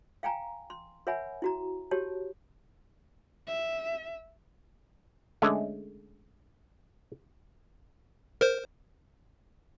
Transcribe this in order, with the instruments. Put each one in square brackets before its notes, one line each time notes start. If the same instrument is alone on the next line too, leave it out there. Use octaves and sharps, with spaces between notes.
[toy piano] F5 G5 G#5 A#5
C6
A#4 C#5 E5 F#5 G#5 B5
E4 F#4 A#5
F#4 G4 C#5 A5
[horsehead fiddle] E5
[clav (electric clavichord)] D3 G#3 A3 C#4
[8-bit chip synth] A#4 C5